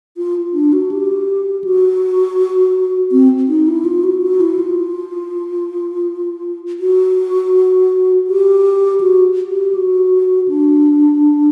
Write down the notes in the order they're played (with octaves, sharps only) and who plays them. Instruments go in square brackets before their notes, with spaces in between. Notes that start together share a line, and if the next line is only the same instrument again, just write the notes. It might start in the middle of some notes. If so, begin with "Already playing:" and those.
[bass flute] F4
D4
F#4
G4
F#4
C4
D#4
E4
F4
F#4
F#4
E4
F4
F#4
G4
F#4
G4
F#4
D4